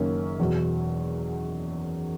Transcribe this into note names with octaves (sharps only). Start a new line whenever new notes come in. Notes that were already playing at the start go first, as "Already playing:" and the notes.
Already playing: F#1 F#2 D#3 A#3 C#4
E2 B2 F#3